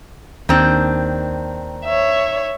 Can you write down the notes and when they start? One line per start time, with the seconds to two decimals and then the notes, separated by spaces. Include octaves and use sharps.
0.49 D#2 D#3 C4 D4
1.85 C#5 E5